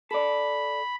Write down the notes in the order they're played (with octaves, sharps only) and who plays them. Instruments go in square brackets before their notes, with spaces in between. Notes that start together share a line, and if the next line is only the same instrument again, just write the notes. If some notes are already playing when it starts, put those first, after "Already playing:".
[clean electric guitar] A4 D5 [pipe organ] B5